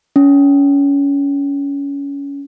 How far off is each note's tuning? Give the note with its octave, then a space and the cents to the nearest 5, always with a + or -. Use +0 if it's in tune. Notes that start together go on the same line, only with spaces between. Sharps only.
C#4 +25